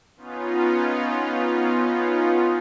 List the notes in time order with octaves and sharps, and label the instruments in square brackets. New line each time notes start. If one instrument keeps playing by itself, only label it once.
[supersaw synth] B3 C#4 D#4 F4